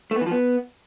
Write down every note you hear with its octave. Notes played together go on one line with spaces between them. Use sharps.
A3
B3
E3
F3
B3